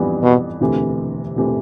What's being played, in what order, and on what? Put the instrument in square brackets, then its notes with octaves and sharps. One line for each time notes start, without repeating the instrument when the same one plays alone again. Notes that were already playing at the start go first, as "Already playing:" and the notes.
Already playing: [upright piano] F2 E3 G3 B3 D4
[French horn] B2
[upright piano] E1 D2 C3 E3 A3
E1 C3 E3 A3